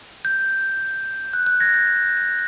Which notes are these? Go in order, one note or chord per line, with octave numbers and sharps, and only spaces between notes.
G6
F#6
F#6
G#6 A#6
G6 A6